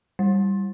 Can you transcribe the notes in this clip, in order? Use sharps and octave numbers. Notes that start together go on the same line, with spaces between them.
G3